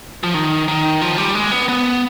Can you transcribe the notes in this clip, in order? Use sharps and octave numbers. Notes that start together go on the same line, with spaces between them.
F3
D#3
D#3
F3
G3
G#3
B3
B3